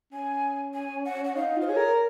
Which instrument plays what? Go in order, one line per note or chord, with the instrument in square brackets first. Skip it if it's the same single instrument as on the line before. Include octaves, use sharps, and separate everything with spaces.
[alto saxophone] C#4 [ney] G#5
[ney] G#5
F#5
F#5
[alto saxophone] D#4 [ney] F5
[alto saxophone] F4 [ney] C5
[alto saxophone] G#4 [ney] C#5
[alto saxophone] A#4